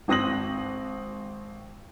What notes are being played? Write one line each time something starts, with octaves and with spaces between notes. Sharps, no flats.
G#1 C4 D#6 A#6 F#7